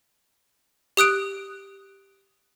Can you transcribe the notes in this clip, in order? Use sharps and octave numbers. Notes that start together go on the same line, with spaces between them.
G4 D#6 F#6 D7